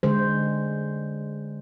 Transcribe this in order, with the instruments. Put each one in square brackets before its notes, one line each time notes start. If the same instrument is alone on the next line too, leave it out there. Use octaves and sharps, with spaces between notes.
[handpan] D3 G#3 C5